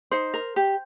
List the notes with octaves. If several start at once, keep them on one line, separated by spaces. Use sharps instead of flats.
D#4 C5
A#4
G4